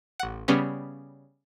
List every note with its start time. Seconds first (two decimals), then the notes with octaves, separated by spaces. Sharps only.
0.19 A1 F#5
0.48 C#3 G3 B3 C#4